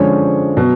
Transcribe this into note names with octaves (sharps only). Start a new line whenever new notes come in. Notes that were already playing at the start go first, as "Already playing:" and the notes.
Already playing: D3 F3 G#3 C#4 C#5
B2 F#3